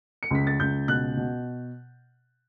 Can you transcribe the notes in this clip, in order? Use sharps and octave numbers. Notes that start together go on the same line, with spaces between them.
C#7
C#2 B6
A6
C#2 G6
B2 F#6
B2